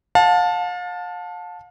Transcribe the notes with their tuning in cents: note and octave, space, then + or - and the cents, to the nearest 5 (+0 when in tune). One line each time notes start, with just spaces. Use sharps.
F5 +40 A5 +0